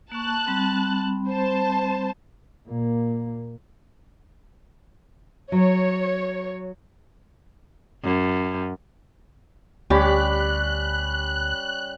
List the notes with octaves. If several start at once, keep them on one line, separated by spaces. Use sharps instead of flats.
A#3 A5 C#6 F#6
G3 C4 B5
C5 A5
A#2 A#3
F#3 C#5
F#2
D2 G3 C#4 G4 B5 F#6